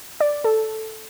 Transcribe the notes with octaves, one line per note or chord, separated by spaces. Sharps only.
D5
A4